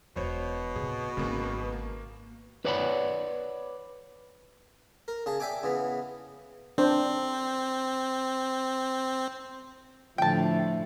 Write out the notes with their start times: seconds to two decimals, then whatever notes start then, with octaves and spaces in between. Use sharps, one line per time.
0.16 E1 B2 E3 C5 C#5
0.76 A2 C3 G#4
1.17 D#1 G#1 C#3 A#3 C4
1.72 A#3
2.65 B4 C#5 D5 F#5 A#5 B5
5.08 A#4
5.26 C#3 G#4 A5
5.40 D5 E5 G5 G#5 D6
5.63 C#3 E3 B3
6.78 C4 D4 C5
10.18 A2 D3 F3 G5 A5